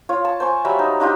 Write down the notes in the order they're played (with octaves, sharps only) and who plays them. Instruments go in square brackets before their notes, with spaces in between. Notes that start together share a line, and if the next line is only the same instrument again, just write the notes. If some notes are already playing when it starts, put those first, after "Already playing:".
[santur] F4 C#5
A5
C5 G#5 A5 C#6
F#3 G3 E5
D#4
D4 D#4 F4 G4